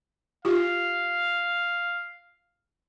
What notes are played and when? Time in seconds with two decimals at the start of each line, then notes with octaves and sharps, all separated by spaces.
0.45 F4 G4 F5